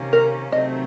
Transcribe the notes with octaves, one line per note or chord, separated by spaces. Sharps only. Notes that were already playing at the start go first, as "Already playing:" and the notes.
Already playing: C3 D#3 A#3 C#4
A#4
C3 D#3 F#3 A3 C4 D#5